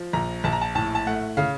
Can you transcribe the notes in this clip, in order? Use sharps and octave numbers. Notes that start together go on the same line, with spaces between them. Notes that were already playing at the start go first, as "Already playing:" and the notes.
Already playing: F3
A#1 A#5
A#1 A5
A#5
A5
A2 A5
A5
A3 F#5
C#3 F5